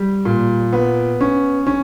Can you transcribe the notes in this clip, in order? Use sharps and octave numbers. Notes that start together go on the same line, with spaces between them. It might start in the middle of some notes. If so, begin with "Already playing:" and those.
Already playing: G3
A#2
B3
C#4
C#4